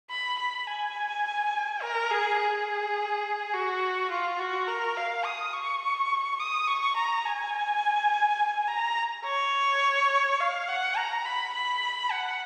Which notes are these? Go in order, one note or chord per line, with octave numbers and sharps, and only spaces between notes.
B5
B5
G#5
A#4
G#4
G#4
F#4
F4
F#4
A#4
F5
D#6
C#6
D#6
C#6
A#5
G#5
A#5
C#5
F5
F#5
A#5
B5
B5
F#5